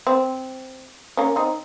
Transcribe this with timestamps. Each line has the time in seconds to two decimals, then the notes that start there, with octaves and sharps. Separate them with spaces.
0.07 C4
1.17 A#3 C#4
1.36 C4 D#4